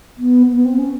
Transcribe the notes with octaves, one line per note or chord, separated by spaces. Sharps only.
B3
B3
C4
C#4